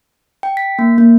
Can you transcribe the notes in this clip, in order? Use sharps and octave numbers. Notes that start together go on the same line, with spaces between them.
G5
B6
A#3
A#3